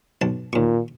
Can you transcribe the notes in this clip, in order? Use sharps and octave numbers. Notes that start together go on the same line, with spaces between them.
B1 A5
D#2 A#2 C#6